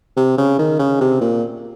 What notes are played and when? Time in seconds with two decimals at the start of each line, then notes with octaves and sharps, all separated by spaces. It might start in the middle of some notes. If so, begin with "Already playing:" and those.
0.17 C3
0.38 C#3
0.59 D#3
0.79 C#3
1.01 C3
1.21 A#2